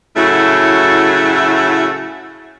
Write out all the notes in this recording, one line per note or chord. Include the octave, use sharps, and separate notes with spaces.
A2 C#3 F#3 A3 E4 F#4